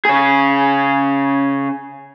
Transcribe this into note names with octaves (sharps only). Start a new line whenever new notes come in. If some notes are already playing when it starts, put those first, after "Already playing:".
C#3 G#4